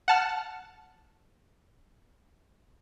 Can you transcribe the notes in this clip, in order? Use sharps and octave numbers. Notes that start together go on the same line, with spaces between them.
F#5 A5 F6